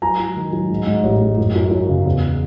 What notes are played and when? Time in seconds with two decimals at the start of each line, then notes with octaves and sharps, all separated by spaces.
0.02 F#3 G#5 A#5
0.19 F#3
0.36 D#3
0.53 F#3
0.70 G#2
0.87 G#2
1.03 A1
1.21 G#2
1.38 F#2
1.55 F#2
1.71 F#2
1.88 C#3
2.06 E2